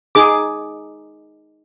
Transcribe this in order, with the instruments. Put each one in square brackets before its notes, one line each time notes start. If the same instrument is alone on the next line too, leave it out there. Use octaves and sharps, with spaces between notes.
[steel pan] D#4 G#4 D6